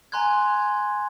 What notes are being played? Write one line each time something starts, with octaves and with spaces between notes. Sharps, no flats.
G#5 A#5 C6 F#6 G#6